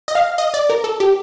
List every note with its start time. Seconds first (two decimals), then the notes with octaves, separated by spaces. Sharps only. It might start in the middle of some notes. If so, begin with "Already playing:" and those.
0.08 D#5
0.15 F5
0.38 D#5
0.54 D5
0.70 A#4
0.84 A4
1.00 G4